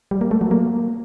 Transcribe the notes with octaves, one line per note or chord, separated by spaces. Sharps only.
G3
A#3
A3
F#3
A#3